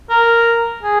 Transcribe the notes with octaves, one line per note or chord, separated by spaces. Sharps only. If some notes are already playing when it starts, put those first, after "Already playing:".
A#4
G#4